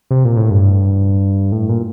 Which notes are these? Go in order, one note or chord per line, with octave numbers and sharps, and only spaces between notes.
C3
A#2
A2
G2
A2
A#2